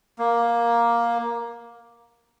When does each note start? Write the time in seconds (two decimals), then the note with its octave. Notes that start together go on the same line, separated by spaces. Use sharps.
0.19 A#3